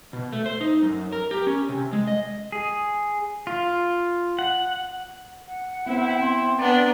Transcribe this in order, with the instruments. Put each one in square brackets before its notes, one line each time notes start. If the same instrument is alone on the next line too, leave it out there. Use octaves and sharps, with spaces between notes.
[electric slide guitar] B2
A3
C5
D#4
F#2
A#4
G4
C#4
C3
G#3
D#5
[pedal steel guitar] G#4
F4
F#5
[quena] F#5
[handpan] B3 C4 C5 [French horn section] E4
[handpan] C4 [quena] C6
[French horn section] F#3 C#4 D5 [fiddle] B3 D4 [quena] A#5